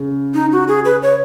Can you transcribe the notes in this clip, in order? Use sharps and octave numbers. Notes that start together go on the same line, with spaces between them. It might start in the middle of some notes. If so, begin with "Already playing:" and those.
Already playing: C#3
D#4
F#4
G#4
B4
C#5